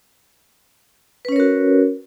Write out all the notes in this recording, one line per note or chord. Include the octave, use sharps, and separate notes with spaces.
C#4 F#4 A#4 B4 C#5